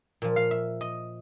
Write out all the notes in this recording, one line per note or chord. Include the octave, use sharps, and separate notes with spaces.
A#2 F3
F5
E5
D#5